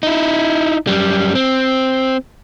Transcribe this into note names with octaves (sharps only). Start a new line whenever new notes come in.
D#4 E4
F#2 G3
C4